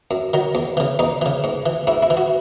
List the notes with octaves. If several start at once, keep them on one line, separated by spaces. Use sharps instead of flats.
F#2
D#3 F#3
E2
C#3 E3
E2 D#4
C#3 E3
G#2
E3
G#2 E4
E4
E3
F#4